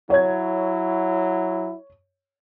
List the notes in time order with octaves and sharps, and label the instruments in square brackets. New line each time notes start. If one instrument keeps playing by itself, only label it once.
[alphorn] F#3 [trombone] E4 [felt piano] C#5 G#6